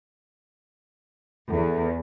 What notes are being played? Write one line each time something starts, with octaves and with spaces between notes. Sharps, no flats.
E2 A4